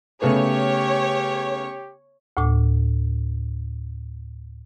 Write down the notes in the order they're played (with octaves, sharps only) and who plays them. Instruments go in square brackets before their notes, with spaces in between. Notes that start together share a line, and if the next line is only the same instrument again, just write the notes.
[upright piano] C#3 A3 B3 [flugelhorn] G4 [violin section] C#5
[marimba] D2 A2 D6